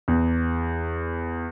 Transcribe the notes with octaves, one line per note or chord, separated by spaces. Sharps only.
E2